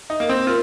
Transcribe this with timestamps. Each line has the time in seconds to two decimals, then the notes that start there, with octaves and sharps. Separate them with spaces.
0.10 D#4
0.20 A#3
0.29 C4
0.47 F4 A#4